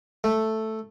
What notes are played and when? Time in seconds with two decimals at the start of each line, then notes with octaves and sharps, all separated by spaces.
0.24 A3